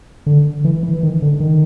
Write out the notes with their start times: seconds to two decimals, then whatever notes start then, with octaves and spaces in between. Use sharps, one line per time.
0.26 D3
0.64 E3
0.83 E3
1.03 D#3
1.22 D3
1.40 D#3